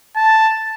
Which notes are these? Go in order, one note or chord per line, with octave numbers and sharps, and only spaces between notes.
A5